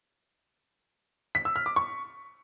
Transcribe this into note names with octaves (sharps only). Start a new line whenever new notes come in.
B6
E6
F6
D6
C#6